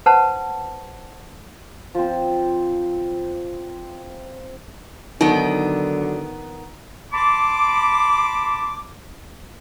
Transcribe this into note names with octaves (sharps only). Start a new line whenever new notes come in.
B4 C5 F#5 A5
F3 C4
D3 D#3 F#3 B3 D#4
A5 B5 C6 D6